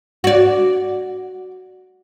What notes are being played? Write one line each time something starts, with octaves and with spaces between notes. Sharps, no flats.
F#4 D5